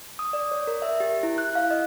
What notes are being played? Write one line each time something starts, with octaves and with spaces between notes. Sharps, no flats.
D#6
D5
C#5
A#4
E5
G4
E4
F#6
F5
D#5